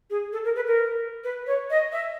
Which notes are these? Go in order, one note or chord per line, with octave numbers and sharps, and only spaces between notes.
G#4
A4
A#4
B4
A#4
B4
C#5
D#5
E5